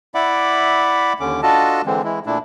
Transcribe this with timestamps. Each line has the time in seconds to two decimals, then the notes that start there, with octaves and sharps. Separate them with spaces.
0.15 E4 D5 E5 F#5 B5 D6
1.20 D#2 D3 C#4 D6
1.43 D4 F4 F#4 A4 D#5 A5
1.86 D3 E3 G#3 C4
2.04 E3 G#3 E4
2.26 A#2 A3 D4 E4